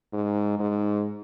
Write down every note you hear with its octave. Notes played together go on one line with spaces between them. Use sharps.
G#2
G#2